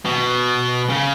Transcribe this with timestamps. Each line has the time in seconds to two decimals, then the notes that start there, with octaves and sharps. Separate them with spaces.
0.05 B2
0.90 C#3